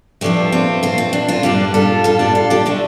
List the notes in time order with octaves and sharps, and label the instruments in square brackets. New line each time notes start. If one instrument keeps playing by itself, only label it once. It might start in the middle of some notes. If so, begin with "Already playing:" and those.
[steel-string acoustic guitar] G2 F3 A3 D4 G4
C4 F4
C4 F4
C4
D4
C4 F4
G2 G3 D4 G4
F4 A4
F4 A4
D4 G4
F4 A4
D4 G4
D3 A3 D4